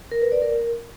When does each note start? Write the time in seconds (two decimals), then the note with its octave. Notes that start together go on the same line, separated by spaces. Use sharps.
0.11 A#4
0.22 B4
0.32 D5
0.42 A#4